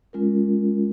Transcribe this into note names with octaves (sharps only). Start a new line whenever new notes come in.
G#3 C#4 F4 A#4